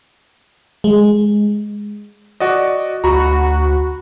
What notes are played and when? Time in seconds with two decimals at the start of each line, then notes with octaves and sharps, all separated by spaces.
0.84 G#3
2.40 F#4 D5 D#5
3.04 D2 F#4 A#5 B5